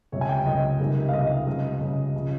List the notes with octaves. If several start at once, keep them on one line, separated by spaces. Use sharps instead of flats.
C#2 C3 G3 C#5
G#5
G5
C#2 C3 G3 D#5
C#2 C3 D#3 G3
F5
C#2 C3 D#3 G3 D#5
C#2 C#3 G3
C#2 C#3 G3
C#3 F3